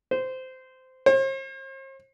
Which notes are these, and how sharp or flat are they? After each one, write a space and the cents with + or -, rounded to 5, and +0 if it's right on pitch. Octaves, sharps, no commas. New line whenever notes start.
C5 -15
C5 +45